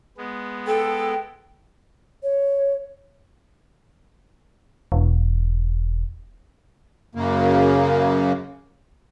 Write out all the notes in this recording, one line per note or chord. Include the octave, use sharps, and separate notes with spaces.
G#3 B3
A4 G5
C#5
E1
F#2 C#3 A#3